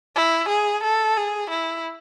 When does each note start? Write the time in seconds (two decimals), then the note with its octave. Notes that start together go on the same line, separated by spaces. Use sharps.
0.16 E4
0.49 G#4
0.84 A4
1.17 G#4
1.51 E4